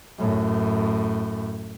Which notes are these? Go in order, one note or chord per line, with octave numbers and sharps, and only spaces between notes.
F#2 A2